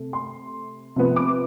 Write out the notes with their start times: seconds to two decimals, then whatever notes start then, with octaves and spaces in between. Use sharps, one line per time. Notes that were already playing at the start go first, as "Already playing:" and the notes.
Already playing: C3 A3
0.13 C6
0.96 C3 F3 B3
1.16 D6